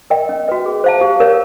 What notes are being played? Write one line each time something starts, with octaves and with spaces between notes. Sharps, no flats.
A#4 D#5 G5
C#4
F#4 B4 D#5
G#4
C5 F5 A5
G4
A#4 C#5 F5